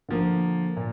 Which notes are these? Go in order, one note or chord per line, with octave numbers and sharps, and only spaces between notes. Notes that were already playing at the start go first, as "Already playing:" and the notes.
D3 F3 A#3
A#2